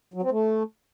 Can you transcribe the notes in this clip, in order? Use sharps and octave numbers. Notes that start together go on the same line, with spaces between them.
F#3
C4
A3